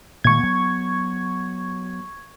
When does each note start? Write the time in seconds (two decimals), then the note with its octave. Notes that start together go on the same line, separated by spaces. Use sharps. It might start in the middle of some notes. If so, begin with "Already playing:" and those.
0.24 A#2 D#3 G#3 C#6 G#6
0.39 F#3 B3